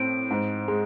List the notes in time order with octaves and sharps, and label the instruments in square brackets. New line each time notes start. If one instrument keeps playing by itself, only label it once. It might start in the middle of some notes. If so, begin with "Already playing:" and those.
Already playing: [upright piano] A2 C4 [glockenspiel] D7
[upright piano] G#2
G#3